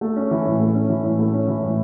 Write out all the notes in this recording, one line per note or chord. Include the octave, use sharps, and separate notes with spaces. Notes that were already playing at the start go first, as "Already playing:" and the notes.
A3
C#4
E3
A2
A3
C#4
E3
A2
A3
C#4
E3
A2